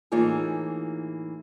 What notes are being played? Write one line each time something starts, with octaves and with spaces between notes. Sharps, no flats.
A2 E3 A#3 D#4 F4 G#4